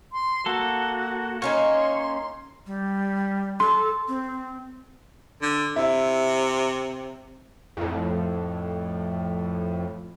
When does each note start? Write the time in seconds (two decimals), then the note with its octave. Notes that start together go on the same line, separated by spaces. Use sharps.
0.13 C6
0.46 A#3 F#4 A4
1.42 A#3 C#4 D#4 C#5 C6
2.67 G3
3.60 A4 C6
4.08 C4
5.42 D3
5.76 C3 E4
7.77 F2 A2